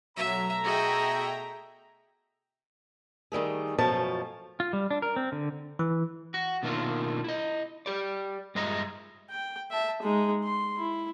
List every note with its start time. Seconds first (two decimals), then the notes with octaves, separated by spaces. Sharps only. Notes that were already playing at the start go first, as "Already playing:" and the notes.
0.17 B2 F#3 A3 E5 A#5
0.64 F#4 G#4 D#5 E5 G5
3.32 D#3 G3 A3 G#4
3.78 F#2 B2 F3 A3 C#4 A5
4.60 F4
4.73 G3
4.91 D4
5.02 A#4
5.16 C4
5.32 D3
5.79 E3
6.34 F#4
6.63 B2 D#3 A3 A#3 D4 F4
7.24 E4 D#5
7.86 G4 D5
8.55 G2 G#3 D#5 E5 A#5
9.31 G5
9.71 E5 A5
10.03 G#3 D#4
10.44 C6
10.78 E4